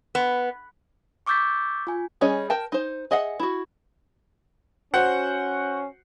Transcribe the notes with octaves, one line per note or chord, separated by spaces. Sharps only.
B3
C#6 D6 E6 G6 A6 B6
F4 G#5
G3 C#4 G#4 C#5 D#5
A#4 G5 A5
D#4 C5
G#4 D#5 E5 F#5
E4 F#4
C#4 F#4 C5 F#5